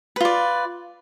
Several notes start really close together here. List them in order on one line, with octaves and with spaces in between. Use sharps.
B4 F4 D5